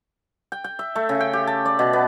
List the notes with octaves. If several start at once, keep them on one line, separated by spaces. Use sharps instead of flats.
G5
G5
E5
A3
C#3
G5
G4
A5
D5
B2
B3